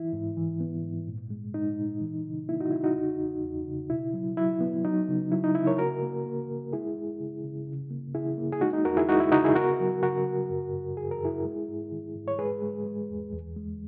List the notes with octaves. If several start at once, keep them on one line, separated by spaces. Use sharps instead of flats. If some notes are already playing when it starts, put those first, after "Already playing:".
Already playing: E3 E4
G#2
E3
B3
G#2
A#2
G#3
G#3 D#4
A#2
E3
C#3
A#3 E4
D#4 F#4
C#3 E4
D#4 F#4
E2
E2
E2
C#3
B2 E4
F#3
F#3 E4
B3
F#3 D#4
C#3
F#3 E4
D#4
C#3 E4
A#4 C#5
A#3 F#4 A#4
A#3
A#3
A#3
G#3 E4 G#4
G#3
C#3
C#3
C#3
A#3
C#3 E4 G#4
A#3
G#4
G#3 D#4 F#4
D#4
E2 F#4 A#4
E4 G#4
G#3 D#4 F#4
E4
C#3 D#4 F#4
E4 G#4
B3 F#4 A#4
F#3
C#3 F#4 A#4
C#3
F#2
F#2
F#2 G#4
A#4
F#2 E4 G#4
G#3
G#2
D#3
G#2
C#5
G#3 G#4 B4
G#3
G#3
E2
E2
G#3